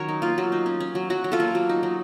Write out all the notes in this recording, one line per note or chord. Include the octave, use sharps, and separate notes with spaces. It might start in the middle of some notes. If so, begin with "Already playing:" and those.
Already playing: D#3 F#3 C#4 A#4 C#5
D#4
A#3 F4
F#3
D#4
C#4
C#4
F#3
F#3 F#4
F#3
F4 A4
A#3
F#3
D#4
F#3